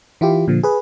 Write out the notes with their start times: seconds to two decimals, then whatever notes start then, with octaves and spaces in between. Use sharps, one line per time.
0.21 E3 E4 F4 G4
0.48 A#2 D3 F3
0.63 G#4 B4